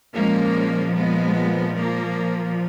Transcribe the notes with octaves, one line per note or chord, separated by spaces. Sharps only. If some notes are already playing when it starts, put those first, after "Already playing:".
A#2 F3 G#3 A#3 C#4
G#3 B3
A#3